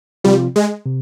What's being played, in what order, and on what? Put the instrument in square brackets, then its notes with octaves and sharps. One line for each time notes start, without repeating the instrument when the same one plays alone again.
[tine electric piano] C3 F3 C4 F4 [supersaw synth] G3
[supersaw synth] G#3
[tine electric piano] C3